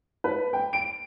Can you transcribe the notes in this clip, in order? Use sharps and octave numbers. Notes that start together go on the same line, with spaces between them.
B4
G5
D7